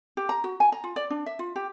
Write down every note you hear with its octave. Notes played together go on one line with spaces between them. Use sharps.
G4
A#5
F#4
G#5
A#5
F4
D5
D4
E5
F4
G4